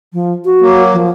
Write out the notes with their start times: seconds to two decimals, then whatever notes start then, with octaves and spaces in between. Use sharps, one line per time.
0.13 F3
0.45 F#4
0.61 F#3 A#3
0.93 F3